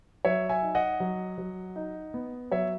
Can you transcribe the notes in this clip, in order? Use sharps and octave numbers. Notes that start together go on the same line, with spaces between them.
F#3 C#5 E5
E5 G#5
D#4
D#5 F#5
F#3
F#3
D#4
B3
F#3 C#5 E5